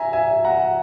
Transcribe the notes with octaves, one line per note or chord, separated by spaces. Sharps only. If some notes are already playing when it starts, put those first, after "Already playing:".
Already playing: E5 G#5 A#5
E5 G#5
F#5 A#5